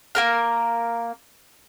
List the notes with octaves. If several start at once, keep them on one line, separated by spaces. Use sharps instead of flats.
A#3 A#4 F6